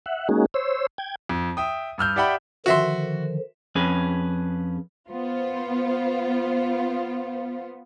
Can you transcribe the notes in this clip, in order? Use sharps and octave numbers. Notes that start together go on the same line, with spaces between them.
E5 F#5
G#3 A#3 C#4 D#4 F#4 G#4
C5 C#5 E6
G5 G#6
F2
E5 G5 D#6
G2 E6 F6 G6
G4 D5 E5 F#5 G5 B5
D3 D#3 F3 F#4 E5 C6
F2 C#4 G#4 B4
B3 F4 C5